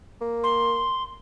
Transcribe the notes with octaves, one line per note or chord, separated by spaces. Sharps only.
A#3
C6